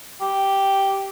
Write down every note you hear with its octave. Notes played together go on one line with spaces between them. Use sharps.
G4